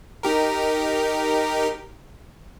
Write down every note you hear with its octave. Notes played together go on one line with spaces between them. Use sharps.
D#4 G4 A#4